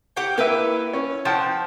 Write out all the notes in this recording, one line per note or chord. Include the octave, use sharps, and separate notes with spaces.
G4 F#5 G5
A#3 E4 B4 E5
C#4
F3 F#5 G5 A5